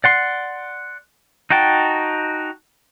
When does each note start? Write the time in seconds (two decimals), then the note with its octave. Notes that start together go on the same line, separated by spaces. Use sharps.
0.04 D5 F#5 C6
1.50 D#4 F#4 G5 A5